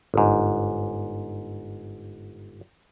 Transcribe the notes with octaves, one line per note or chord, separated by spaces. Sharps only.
G1 G#2